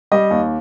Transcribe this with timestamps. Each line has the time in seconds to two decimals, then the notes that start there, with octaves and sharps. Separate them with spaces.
0.12 G3 D#5
0.30 D#2